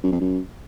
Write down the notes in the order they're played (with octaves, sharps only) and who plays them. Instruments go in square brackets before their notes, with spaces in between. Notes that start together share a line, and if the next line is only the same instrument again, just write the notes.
[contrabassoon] F#2
F2
F#2